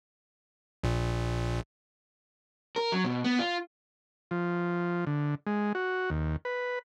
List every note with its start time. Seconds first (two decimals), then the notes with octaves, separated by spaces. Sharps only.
0.84 A#1 A#2
2.76 A#4
2.92 F#3
3.04 B2
3.24 B3
3.39 F4
4.31 F3
5.07 D3
5.47 G#3
5.75 F#4
6.10 D#2
6.45 B4